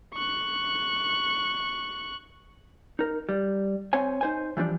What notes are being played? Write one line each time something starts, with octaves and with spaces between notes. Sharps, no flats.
C#6 F#6
D#4 A#4
G3
C4 C5 C#5 G#5
D#4 C5 G#5
E3 F3 G3 C#4 D4